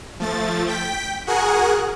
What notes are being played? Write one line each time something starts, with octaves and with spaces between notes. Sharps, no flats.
F3 A3 A6
G5 B6
F#4 G#4 A#4 F#5 G#5 F#6